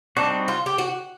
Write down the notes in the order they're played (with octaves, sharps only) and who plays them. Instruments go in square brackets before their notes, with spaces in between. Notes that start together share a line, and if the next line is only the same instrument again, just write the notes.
[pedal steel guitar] G3 C4 D#4 F#4 [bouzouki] D4
[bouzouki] F4
G4
F#4